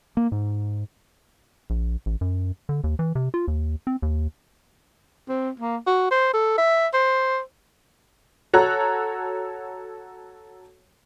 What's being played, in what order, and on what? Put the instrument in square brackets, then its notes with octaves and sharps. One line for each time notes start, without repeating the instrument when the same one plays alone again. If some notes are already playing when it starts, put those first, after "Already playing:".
[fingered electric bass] A#3
G#2
[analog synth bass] A#1
A1
F#2
D3
D#2
E3
C3
F4
D#2
C4
D#2
[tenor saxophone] C4
A#3
F#4
C5
A4
E5
C5
[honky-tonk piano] F#4 A4 C#5 A#5 F#6